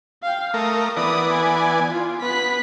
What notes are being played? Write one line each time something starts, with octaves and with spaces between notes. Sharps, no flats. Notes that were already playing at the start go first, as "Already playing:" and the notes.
F5 G5
A3 A#4 D#6
E3 B3 D5 D#6
G#5
F4
B3 F#6 B6